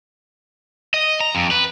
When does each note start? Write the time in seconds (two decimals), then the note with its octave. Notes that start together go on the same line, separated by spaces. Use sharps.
0.94 D#5
1.21 A#5
1.35 F2
1.51 B4